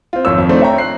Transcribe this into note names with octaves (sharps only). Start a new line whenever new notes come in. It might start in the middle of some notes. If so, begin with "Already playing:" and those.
C4 F4
G#1 F2 F3 C#5 E6
F2
A3 C4 D4 D#4
C#5 E5 G5 A#5
F#6 C7